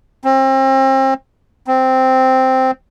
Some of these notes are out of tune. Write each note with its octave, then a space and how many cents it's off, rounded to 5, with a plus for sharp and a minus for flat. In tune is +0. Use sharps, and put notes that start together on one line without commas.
C4 +35
C4 -5